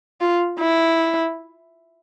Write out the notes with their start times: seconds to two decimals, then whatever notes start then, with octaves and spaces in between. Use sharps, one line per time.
0.21 F4
0.60 E4